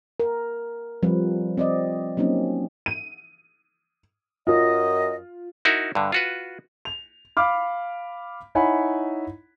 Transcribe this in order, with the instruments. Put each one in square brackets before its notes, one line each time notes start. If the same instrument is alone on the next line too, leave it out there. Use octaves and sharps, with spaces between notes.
[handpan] A#4
F3 G3 C4 B4
C4 D5 D#5
F#3 A#3 C4 C#4 D#4
[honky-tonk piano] D#7
[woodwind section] F#2 D#5 [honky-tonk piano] F4
[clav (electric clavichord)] D#4 E4 F#4 A#4 E5
G2 D3
F4 F#4 B4
[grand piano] F7
F5 B5 D6 F6
D#4 E4 C#5 F#5 G#5 B5